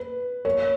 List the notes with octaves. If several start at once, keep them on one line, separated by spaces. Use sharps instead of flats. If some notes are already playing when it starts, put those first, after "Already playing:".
Already playing: B4
C#5